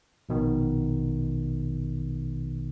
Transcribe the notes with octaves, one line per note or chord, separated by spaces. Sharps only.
A#1 B2 D#3